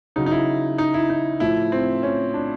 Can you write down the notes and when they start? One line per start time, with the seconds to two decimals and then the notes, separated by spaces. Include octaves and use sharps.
0.16 C#3 F#3 D#4
0.26 D#4
0.31 E4
0.78 D#4
0.94 E4
1.10 D#4
1.40 A2 F3 E4
1.72 C4
2.03 C#4
2.34 D4